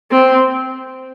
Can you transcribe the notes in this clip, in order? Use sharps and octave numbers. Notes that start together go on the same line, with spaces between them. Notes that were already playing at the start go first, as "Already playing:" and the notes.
C4